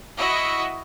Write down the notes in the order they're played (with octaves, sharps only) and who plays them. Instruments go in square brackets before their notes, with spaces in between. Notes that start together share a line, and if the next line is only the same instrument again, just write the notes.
[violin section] E4 F#4 D#5 E5